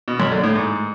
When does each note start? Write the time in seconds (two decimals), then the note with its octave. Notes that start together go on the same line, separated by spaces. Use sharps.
0.08 B2
0.20 F#2
0.31 D3
0.43 A2
0.55 G#2